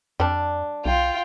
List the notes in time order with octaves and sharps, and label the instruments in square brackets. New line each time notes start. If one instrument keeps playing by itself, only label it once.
[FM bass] F2 [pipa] G3 D4
[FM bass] B1 [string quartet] F4 G5